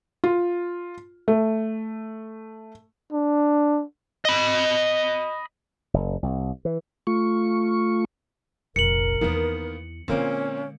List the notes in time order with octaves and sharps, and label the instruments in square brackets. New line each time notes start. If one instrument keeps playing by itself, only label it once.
[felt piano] F4
A3
[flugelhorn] D4
[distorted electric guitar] D#5 B5
[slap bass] F#1
C2
E3
[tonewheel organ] A3 F4 C#6
[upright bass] F1 A#1 [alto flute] A#4 [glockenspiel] C#7 F#7
[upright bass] E2 E4 [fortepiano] D#3 A#3 B3
[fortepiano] A#2 A#3 C4 [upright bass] D3 G#3 [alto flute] C#4